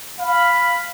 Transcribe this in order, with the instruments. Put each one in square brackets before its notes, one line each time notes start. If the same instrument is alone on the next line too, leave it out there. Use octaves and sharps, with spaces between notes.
[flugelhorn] F5 [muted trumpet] B5